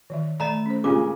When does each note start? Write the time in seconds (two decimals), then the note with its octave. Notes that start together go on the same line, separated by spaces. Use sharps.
0.10 D#3 E3 E5
0.40 A3 D5 D#5 A#5 B5
0.66 C#4 C5
0.84 A#2 C#3 G#3 F4 G4 D6